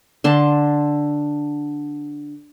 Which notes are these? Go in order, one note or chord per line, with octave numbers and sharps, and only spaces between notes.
D3 A5 C6